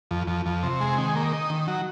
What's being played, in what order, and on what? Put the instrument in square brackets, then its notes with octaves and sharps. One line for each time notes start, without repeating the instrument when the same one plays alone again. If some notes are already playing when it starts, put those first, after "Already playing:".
[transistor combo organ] F2
F2
F2
C3
G#3
D#3
A#3
D#4
D#3
F#3